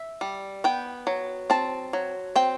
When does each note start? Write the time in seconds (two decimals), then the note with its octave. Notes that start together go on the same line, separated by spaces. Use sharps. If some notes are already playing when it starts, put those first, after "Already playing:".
Already playing: E5
0.21 G3
0.64 B3 G5
1.07 F#3
1.50 C4 A5
1.93 F#3
2.36 C4 G5